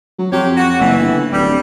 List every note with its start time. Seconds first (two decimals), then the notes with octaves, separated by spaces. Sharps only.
0.18 F#3
0.32 F2 C3 G4 C#5
0.57 F#4
0.80 F#1 E3
1.01 G1
1.33 D1 G3